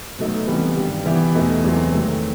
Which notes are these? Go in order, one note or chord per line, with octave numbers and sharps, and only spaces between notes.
B2 F#3 A3 D#4
C3 E3 G3 B3
G2 D#3 G3
E3 B3 E4 G4
E2 B2 A3 D#4
E2 C3 F#3 C4 E4
D#3 F#3 A3 C4